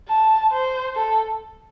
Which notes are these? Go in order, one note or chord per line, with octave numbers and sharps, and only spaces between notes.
A5
C5
A4